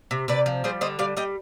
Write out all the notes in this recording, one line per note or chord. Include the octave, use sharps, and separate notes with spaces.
C3
C3 B4 D5
F3
G3 G#4 C5
D3 C5 D#5
G3 D5 F5
G3 D#5 G5